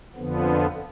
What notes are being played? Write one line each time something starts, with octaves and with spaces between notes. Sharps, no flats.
F2 D3 F3 B3